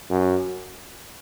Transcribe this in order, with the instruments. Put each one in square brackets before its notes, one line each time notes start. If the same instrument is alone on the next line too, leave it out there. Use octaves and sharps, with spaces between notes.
[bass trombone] F#2